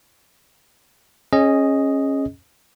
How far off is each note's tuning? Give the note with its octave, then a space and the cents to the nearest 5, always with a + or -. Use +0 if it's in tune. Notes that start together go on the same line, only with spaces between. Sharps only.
C#4 -20 G#4 +10 D#5 +0